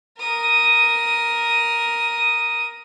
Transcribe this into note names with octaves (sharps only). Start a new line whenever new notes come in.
A#4 D#6